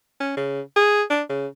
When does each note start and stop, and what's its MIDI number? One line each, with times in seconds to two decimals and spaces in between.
0.20 0.35 61
0.37 0.61 49
0.76 1.03 68
1.10 1.23 62
1.30 1.47 49